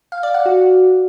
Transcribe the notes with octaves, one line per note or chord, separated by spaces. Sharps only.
F5
D5
F#5
F#4